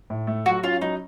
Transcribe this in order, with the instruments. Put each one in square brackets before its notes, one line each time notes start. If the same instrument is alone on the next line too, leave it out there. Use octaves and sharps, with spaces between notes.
[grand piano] A2
A3
[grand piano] F#3 [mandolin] F#4
[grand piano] C#4 [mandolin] F4
[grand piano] F#3 [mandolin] D#4